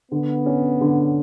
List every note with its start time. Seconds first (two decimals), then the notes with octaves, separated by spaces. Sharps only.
0.11 D3 B3
0.46 C#4
0.81 D3